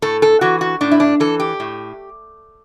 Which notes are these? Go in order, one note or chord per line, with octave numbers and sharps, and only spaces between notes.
A2 A4
A4
E3 F#4
F#4
A2 D4
E4
D4
E3 A4
G4
A2